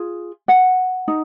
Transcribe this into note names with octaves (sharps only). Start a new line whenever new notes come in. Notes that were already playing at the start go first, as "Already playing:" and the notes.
Already playing: F4 G#4
F#5
D#4